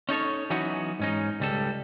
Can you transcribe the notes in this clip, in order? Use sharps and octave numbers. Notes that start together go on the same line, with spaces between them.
C#4 D#4 A4 C#5
E3 F#3 B3 C#4 D#4 F#4
G#2 C#4 D#4
C#2 G3 A4